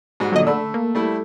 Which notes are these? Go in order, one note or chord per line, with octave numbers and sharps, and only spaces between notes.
G#2 G3 F#4
A#2 D3 F3 F#3 D#5
D3 A3 B5 E6
A#3
G3 A3 E4